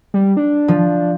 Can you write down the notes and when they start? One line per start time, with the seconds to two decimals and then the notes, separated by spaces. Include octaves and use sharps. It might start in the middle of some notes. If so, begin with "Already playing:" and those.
0.14 G3
0.37 D4
0.68 F3